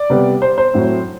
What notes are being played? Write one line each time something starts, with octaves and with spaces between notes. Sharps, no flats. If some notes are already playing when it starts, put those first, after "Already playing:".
Already playing: D5
C3 G3 B3
C5
C5
A2 F#3 A3 C4